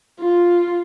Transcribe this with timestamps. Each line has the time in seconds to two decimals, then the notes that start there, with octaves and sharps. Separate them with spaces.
0.21 F4